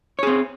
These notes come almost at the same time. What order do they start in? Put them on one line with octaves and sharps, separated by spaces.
C#5 G#4 C4